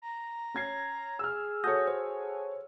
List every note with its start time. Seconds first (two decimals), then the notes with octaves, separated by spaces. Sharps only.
0.02 A#5
0.54 C#4 G#6 C7
1.19 G#4 E6 F6
1.64 F#4 A4 C#5 D#6 G6 A#6
1.88 C5